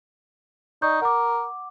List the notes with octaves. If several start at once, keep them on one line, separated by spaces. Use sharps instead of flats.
D#4 D5 C#6 G6
A#4 F#5 D6